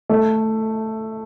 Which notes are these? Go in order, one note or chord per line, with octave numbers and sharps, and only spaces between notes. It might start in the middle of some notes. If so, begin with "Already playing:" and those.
A3